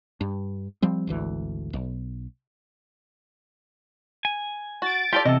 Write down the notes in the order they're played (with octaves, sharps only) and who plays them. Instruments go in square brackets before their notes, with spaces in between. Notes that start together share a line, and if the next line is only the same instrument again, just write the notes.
[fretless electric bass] G2
F3 G3 C4
G#1 D2 E3
B1
[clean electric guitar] G#5
[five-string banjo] F#4 [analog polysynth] A6 D7
[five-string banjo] F4 A4 D5 [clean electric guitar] G4 G5
[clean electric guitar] E2 A4 [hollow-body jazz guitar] C3 [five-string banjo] D#5